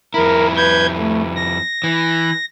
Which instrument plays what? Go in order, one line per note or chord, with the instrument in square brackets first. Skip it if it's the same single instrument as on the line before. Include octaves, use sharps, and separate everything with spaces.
[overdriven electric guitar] F2 E4 [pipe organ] A#4
[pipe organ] B4 G6 G#6
A3
A#6
[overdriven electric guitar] E3